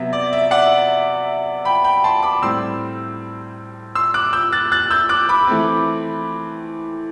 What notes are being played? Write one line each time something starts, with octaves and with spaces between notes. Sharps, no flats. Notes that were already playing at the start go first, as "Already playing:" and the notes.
Already playing: C3 F#3 B3 E5
D5
E5
D5 F#5
G5 B5
G5 B5
A5 C6
B5 D6
A2 G3 C4 C6 E6
C6 E6
D6 F#6
E6 G6
F#6 A6
F#6 A6
E6 G6
D6 F#6
B5 D6
E3 A3 C4